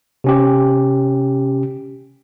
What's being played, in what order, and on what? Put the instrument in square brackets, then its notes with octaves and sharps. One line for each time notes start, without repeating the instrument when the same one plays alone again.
[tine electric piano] C3 C#4 G4